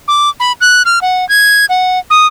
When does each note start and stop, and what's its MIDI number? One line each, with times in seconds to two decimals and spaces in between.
0.08 0.30 86
0.40 0.52 83
0.61 0.83 90
0.85 0.99 89
1.02 1.27 78
1.29 1.66 92
1.69 1.99 78
2.10 2.27 87